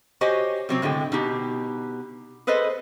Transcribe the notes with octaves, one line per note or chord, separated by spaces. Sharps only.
F#4 G4 C5 C#5 D#5 G#5
C3 F#3 C4
A2 D3 G#3 G5
B2 D#4 G4
G#4 A4 B4 C5 D#5